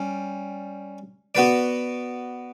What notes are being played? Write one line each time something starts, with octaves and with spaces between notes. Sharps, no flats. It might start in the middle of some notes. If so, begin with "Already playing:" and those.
Already playing: G3 C#4
B3 F#4 B4 D5